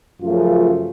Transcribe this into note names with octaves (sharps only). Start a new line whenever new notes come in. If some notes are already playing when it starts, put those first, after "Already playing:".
F#2 C#3 F3 A3 F4